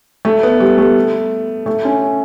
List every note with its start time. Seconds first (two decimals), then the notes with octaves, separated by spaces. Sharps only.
0.25 A3
0.43 B3
0.60 G3
0.78 A3
1.66 A3
1.85 C#4